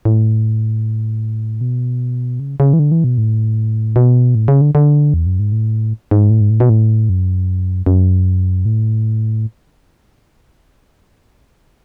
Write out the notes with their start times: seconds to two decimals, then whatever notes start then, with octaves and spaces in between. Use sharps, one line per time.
0.05 A2
1.61 B2
2.40 C#3
2.60 C#3
2.73 E3
2.79 D3
2.92 E3
3.04 B2
3.18 A2
3.96 B2
4.35 A2
4.48 C#3
4.61 D3
4.75 D3
5.14 E2
5.26 F#2
5.39 G#2
5.52 A2
6.11 G#2
6.30 A2
6.41 G#2
6.50 A2
6.60 B2
6.69 A2
7.09 F#2
7.86 F#2
8.65 A2